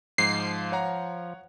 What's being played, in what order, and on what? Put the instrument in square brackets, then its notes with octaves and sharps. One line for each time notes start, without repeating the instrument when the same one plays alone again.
[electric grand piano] G#2 [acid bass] F3 [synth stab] C7
[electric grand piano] C#5 F#5 A#5